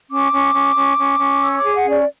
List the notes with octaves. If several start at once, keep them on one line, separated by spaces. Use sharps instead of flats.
C#4 D6
C#4
C#4
C#4
C#4
C#4
C#5 E6
C#6
D6
G#4
F#5
C#4 D5